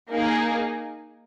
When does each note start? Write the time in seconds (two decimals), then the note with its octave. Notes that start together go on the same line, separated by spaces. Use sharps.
0.11 A#3 D#4 G#4